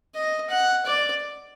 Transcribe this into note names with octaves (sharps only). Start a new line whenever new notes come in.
D#5
F#5
D5